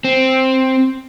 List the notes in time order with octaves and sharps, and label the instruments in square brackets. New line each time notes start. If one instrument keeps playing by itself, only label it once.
[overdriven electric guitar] C4